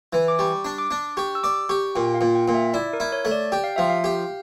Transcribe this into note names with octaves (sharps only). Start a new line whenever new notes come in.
E3
D6
G3 C#6
D4
D6
D4
G4 C#6
E6
D5 D6
G4 C#6
A#2 G5
F5
A#2
G5
A#2
E5
E4 D5
A#4
E4
C#5
A3
D5
G4 G5
F5
F3 E5
F5
G4